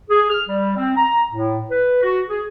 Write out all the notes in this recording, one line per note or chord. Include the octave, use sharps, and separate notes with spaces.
G#4
F6
G3
C4
A#5
A2
B4
F#4
G#4